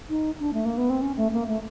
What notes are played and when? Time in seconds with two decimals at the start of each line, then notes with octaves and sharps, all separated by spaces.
0.09 D#4
0.40 D4
0.53 A3
0.65 A#3
0.77 B3
0.90 C4
1.02 C#4
1.17 A3
1.33 A#3
1.48 A3